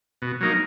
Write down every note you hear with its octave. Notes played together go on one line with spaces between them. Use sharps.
B2
F#3 A#3 D#4